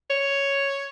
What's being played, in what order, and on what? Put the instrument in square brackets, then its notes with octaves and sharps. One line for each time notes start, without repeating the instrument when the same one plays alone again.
[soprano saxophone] C#5